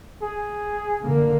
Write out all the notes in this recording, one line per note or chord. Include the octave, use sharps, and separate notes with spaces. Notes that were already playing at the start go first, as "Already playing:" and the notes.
G#4
D3 A#3